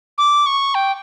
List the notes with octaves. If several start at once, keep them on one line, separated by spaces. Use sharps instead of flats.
D6
C#6
G5